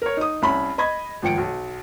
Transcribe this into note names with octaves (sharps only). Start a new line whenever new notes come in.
A#4 C#5
D#4 D#6
C2 C#4 B5
D#5 B5 G#6
G#1 F3 G5 C#7 D7
B1